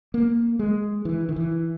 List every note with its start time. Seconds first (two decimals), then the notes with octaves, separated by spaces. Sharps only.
0.14 A#3
0.59 G#3
1.05 E3
1.29 D#3
1.36 E3